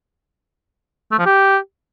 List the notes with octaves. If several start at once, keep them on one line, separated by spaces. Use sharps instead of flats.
A3
F3
G4